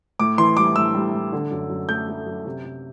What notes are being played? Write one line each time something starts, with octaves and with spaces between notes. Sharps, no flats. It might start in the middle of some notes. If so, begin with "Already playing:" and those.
A2 D6
E3 C6
G3 D6
A2 E6
G3
A2
D3
F#2
F#2
A3 G6
A3
F#2
C3
C3